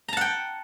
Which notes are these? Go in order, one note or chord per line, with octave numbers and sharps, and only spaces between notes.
F#5 G5 A5 A#5